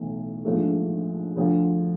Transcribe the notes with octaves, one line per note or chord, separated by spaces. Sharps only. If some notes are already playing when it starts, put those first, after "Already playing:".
Already playing: B1 A2 E3 A3
A#1 G#2 F3 A3 D4
D2 D3 F3